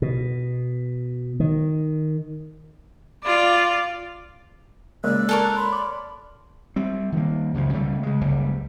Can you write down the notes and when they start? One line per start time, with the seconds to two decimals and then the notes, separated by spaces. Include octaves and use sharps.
0.02 B2
1.40 D#3
3.24 F4 D5
5.04 A#2 C#3 G#3 D5 E6 F#6
5.29 A4 A#4 C#5
5.55 B5 C6
5.72 D5
6.76 G3 C4
7.12 D#3 G3 A#3
7.54 C#2 F#2 C#3 F3
7.73 C#3 G3 A3
8.03 C#3 G#3
8.21 F#1 C#2 C#3 G3